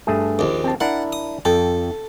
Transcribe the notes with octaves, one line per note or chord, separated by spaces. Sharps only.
G2 A3 G#4
A#1 D#2
C4 A5
D4 E4 A#4 F#5
D#6
F2 A4 G5